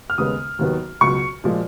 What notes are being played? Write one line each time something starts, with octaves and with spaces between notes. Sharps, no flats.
F6
D#2 C#3 G#3 B3 D#6
D#2 D#3 F#3 B3
C#2 B2 F#3 C#6
A#2 F3 G#3